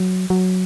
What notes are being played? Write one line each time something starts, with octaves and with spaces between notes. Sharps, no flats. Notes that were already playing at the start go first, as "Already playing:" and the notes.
Already playing: F#3
F#3